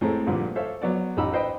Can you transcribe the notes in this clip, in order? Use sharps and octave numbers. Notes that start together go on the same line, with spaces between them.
A2 G#3 A3 C4 A#5
G2 A#2 D3 F3
A4 C5 C#5 E5 F5
F#3 B3 F#4 D5
A1 D#4 G4 A#5 B5 E6
B4 C5 D#5 G5 B5